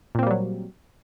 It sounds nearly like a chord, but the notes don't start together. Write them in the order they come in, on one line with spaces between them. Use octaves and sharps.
A#2 C4 A#3 G3 F#3